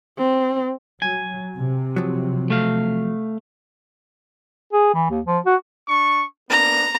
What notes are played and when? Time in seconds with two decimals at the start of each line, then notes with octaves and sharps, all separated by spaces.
0.18 C4
1.02 F#3 G#5
1.59 C3
1.96 F3 F#3
2.50 A3 F5
4.73 G#4
4.94 E3
5.10 D#2
5.26 F3
5.46 F#4
5.88 D4 C#6
6.50 A#3 B3 D4 A#5